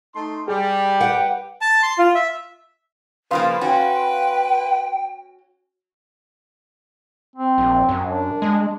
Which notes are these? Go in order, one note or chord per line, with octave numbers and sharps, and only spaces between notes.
A3 D#4 C6
G3 G4 G#4
B4 F#5 G5
A5
C6
F4
E5
C#3 F3 A#3 B4 F5 B5 C6
C#4 F#4 G5
C4
A#1
F#2
D4
G#3